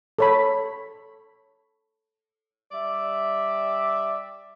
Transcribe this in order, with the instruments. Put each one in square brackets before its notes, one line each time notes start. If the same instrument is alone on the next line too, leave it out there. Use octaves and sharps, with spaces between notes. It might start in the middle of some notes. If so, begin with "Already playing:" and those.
[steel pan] A4 C#5 B5
[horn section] G3 D5 E5